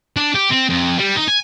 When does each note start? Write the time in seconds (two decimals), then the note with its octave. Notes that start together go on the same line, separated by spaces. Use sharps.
0.17 D4
0.35 G4
0.51 C4
0.70 F2
0.99 G3
1.16 D#4
1.28 G#5